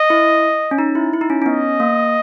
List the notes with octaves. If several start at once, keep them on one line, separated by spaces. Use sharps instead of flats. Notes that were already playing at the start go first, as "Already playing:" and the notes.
Already playing: D#5
E4
C#4
D#4
E4
E4
D#4
C#4
C#4
B3 D#5
A#3